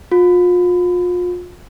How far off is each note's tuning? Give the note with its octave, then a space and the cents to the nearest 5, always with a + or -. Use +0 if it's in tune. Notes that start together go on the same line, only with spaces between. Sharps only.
F4 +35